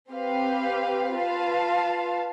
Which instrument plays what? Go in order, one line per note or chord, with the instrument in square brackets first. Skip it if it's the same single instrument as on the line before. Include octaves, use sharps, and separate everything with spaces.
[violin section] C4 G4 B4 F5
F4 B4 F5 A5